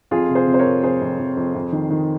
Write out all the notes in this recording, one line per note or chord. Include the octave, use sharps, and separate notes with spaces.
F2 F4 G#4
C3
G#4 C5
C3
C5
A#4 C#5
F2
F2 G#4 C5
F2
F2
F2
F2
D#3
D#3